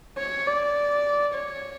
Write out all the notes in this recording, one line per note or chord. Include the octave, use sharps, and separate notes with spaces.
C#5
D5
C#5